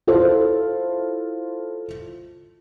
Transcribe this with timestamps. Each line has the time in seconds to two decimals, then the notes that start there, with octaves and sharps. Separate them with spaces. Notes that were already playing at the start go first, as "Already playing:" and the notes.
0.07 E4 F4 A4 C5